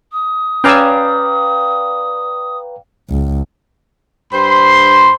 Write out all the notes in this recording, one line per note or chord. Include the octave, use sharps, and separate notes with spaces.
D#6
C#4 B4 D5 F5 G5 G#5 A#5 E6
C#2
G2 C5 B5 C6